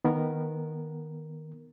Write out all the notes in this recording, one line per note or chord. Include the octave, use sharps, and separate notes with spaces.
D#3 B3 A#4